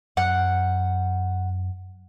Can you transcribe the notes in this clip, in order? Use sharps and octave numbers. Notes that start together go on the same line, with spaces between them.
F#2 F#5